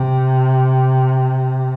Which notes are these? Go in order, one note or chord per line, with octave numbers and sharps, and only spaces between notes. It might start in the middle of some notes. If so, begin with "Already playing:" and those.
Already playing: C3